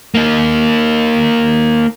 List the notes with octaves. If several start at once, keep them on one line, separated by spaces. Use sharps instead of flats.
A#3 D#4